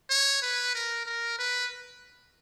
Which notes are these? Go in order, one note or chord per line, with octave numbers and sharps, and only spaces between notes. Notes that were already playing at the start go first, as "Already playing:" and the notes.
C#5
B4
A#4
A#4
B4